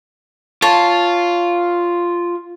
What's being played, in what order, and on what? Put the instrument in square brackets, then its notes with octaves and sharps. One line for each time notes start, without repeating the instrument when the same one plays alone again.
[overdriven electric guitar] F4 [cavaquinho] C#5 A5